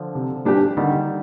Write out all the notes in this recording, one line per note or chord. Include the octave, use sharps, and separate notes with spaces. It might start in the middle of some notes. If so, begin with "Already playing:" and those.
Already playing: D3 F3
C3
G3 D4 G4
D3 D#3 G3